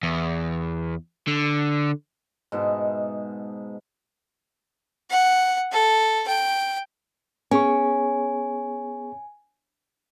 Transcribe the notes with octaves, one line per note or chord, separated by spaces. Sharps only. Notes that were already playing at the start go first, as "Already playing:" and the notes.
E2
D3
G#2 B2 E5 A5
F#5
A4
G5
B3 C#4 G#4 G#5 C#6